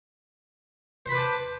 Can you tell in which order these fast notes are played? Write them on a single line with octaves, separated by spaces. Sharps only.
C5 B5 B4 D6 A5